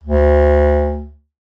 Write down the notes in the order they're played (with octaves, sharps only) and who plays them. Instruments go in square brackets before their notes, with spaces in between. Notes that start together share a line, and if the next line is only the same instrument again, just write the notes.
[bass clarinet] D2